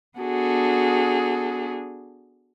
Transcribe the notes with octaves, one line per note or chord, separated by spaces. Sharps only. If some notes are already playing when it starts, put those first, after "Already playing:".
B3 D4 F#4 G#4 A4